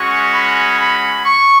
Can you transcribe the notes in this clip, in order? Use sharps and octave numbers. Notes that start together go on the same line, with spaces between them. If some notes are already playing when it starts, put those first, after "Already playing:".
Already playing: G#3 C#4 F#4 C#6
B5
B5
C#6